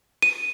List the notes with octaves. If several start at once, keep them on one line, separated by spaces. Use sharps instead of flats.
D#7